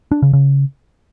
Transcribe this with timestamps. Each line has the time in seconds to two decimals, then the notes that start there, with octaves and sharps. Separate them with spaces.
0.12 D4
0.22 C#3
0.33 C#3